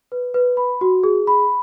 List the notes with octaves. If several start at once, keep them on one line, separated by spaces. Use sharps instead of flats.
B4
B4
B5
F#4
G#4
B5